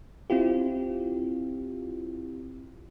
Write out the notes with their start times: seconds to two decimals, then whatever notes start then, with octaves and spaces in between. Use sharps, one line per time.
0.30 C4 E4 F4 G4